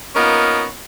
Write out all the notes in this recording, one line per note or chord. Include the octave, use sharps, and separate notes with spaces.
A#3 B3 C#4 D#4 F4 A#4